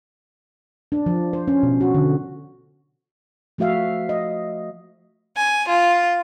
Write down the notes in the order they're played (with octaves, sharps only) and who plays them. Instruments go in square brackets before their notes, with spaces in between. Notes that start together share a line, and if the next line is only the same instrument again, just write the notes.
[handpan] D4
F3
C5
C#4
B2
F#4
D3
F3 A3 F#4 E5 F5
D#5
[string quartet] G#5
F4